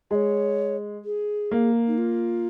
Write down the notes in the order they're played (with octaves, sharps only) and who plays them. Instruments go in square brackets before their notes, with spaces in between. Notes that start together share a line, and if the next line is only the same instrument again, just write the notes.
[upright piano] G#3 [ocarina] D#5
[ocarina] C#5
G#4
[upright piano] A#3
[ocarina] D#4
F4